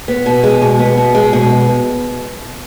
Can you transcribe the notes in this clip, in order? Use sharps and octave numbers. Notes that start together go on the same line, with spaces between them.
B3
B2
G#3
B2
B3
B2
G#3
B2